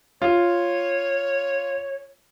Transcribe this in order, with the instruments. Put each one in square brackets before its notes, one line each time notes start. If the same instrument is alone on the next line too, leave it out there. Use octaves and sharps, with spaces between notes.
[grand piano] F4 [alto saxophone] C#5